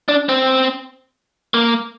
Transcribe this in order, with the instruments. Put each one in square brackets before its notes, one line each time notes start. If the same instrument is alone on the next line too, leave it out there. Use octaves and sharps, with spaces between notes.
[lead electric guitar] D4
C4
A#3